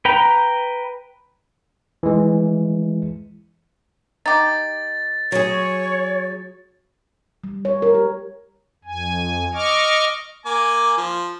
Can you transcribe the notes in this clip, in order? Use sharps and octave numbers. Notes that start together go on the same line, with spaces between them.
B4 G5 A#5
E3 G#3
D#4 G4 A6
F#3 G#4 C#5
G3
C#5
A#4
G4
F2 G#5
D#5 C#6 D6 F6
A#3 G#5 D6
F3